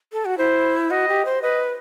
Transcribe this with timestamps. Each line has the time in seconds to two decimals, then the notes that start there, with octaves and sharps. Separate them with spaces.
0.13 A4
0.25 F#4
0.38 E4 C5
0.91 F#4 D#5
1.08 G4
1.25 C5
1.42 B4 D#5